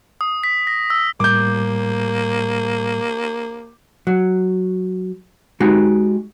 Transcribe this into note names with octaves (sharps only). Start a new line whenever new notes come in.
D#6
B6
A#6
E6
A2 G3 A#3 D6 G6
F#3
G#3 D#4 F#4 G4